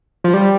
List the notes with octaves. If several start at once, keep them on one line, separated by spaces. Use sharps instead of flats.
F3
G3